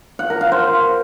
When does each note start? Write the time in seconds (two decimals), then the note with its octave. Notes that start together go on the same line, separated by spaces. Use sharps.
0.19 F#5
0.30 A#4
0.41 F5
0.52 C5